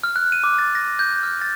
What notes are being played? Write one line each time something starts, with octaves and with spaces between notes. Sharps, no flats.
F6
F#6
D#7
D6
A6
A#6
G6
F6
A6